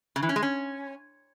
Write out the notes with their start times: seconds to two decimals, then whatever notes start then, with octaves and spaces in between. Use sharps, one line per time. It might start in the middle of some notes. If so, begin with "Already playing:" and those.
0.16 C#3
0.22 E3
0.29 C#4
0.36 G#3
0.42 C#4